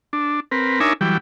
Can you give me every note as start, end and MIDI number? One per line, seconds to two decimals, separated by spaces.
0.13 0.40 62
0.52 0.80 60
0.52 0.80 70
0.52 0.80 71
0.80 0.93 62
0.80 0.93 63
0.80 0.93 70
0.80 0.93 73
0.80 0.93 76
0.80 0.93 80
1.01 1.17 52
1.01 1.17 54
1.01 1.17 55
1.01 1.17 79